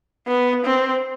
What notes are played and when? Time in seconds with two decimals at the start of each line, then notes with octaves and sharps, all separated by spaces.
0.27 B3
0.65 C4